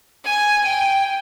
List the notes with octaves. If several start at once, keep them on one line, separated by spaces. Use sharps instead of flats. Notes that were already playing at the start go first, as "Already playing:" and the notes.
G#5
G5